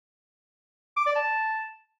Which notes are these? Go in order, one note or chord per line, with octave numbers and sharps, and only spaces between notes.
D6
D5
A5